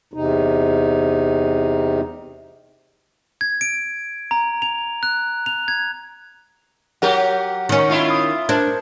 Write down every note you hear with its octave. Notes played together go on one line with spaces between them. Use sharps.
E2 C3 D#4
G#6
D7
A#5
F7
F#6
F7
G#6
F#3 G4 A#4 F#5
D#3 C#4
E4 F4
D#6
D4 A#4 C5 G#6